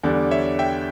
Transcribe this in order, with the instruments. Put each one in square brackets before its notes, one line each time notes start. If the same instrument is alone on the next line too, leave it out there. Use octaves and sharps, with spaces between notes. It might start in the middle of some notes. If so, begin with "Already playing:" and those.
[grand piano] E2 D3 G3 D4
[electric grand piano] C#5 E5
E5 G5